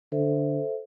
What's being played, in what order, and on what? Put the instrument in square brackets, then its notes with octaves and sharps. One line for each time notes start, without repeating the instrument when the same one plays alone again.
[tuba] D3 [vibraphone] A4 C5 E5